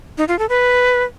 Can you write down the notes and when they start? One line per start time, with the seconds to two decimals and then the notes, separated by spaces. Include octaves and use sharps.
0.18 D#4
0.28 F4
0.39 A4
0.49 B4